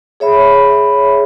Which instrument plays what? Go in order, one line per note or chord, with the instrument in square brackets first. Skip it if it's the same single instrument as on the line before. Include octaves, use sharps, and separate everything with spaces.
[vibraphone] G#4 C#5 E5 B5